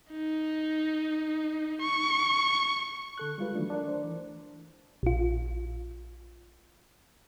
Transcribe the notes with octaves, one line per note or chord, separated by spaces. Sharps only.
D#4
C#6
D3 A4 F#6
G3 G#3 F4 B4
D#3 E3 F#3 A3 D4
D4 A#4 D5
C5
E3
A#1 F4